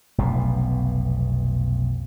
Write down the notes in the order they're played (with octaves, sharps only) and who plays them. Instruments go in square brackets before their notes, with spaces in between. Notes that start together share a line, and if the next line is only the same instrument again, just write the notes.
[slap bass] F1 B1 B2